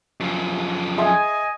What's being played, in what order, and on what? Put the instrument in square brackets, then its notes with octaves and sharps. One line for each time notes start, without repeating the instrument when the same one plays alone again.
[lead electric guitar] F#2 F3
[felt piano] G#4 E5 C6 [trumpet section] D#5 G#5